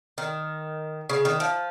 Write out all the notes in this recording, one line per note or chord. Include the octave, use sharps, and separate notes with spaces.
D#3
C#3
D#3
F3